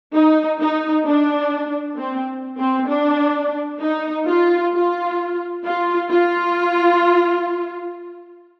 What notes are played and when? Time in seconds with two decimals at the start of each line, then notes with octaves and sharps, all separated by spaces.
0.14 D#4
0.59 D#4
1.06 D4
1.97 C4
2.58 C4
2.89 D4
3.81 D#4
4.27 F4
4.73 F4
5.65 F4
6.11 F4